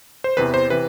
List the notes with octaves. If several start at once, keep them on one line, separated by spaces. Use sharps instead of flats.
C5
E2 C3 E3 B4
C5
C3 E3 B4